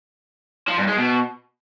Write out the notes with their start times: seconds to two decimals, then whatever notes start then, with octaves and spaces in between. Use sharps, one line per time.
0.68 F3
0.78 G2
0.87 G#3
0.97 B2